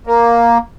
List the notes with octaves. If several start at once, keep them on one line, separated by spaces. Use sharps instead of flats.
A#3